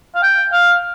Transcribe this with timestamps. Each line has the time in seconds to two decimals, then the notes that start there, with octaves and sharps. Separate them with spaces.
0.15 F5
0.23 G5
0.52 F5